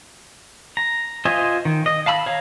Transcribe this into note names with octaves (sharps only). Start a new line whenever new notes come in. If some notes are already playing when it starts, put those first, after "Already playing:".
A#5
F4 C5 D#5 E5 G#5
D#3
D#5
F5 A5 B5 E6
C#5 F5 A#5